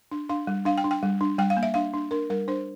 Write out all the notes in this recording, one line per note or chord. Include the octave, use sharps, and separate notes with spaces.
D4
D4 F5
G3
D4 F5
G5
D4
G5
G3
D4
G3 G5
F5
A#3
E5
D4 F5
D4
D4 A#4
G3 A#4
D4 C5